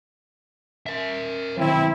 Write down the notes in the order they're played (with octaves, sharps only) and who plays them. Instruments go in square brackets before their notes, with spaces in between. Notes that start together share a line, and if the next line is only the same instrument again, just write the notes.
[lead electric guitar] A#4 E5
[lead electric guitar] D#3 F#3 [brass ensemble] C4 E4